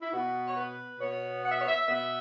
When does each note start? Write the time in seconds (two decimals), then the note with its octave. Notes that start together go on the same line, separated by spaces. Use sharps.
0.01 E4
0.13 B2 B3 F#4
0.46 C#5
0.57 B4
0.99 B2 B3 C#5
1.43 F#5
1.51 E5
1.59 C#5
1.67 E5
1.87 B2 B3 E5